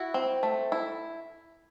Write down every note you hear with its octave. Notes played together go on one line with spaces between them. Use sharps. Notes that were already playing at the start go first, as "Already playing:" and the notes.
Already playing: E4 F#4
C4
A3
E4